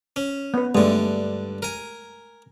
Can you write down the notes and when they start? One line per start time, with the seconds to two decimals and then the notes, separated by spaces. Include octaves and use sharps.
0.16 C#4
0.54 B3 B4
0.75 G2 D3 G#3 A3
1.62 A#4 G#5